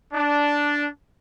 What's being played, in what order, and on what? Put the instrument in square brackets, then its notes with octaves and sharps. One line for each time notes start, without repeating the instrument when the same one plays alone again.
[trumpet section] D4